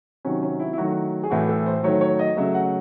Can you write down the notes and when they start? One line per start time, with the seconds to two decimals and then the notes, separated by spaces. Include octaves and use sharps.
0.25 C3 D#3 F#3 C#4
0.42 C#4
0.60 E4
0.73 E4
0.77 D#3 F#3 A3 F#4
1.23 G#4
1.30 A2 E3 A3 F#4
1.49 A4
1.66 C5
1.83 D#3 F#3 A3 C#5
2.01 C#5
2.19 D#5
2.37 C#3 F#3 A3 E5
2.54 F#5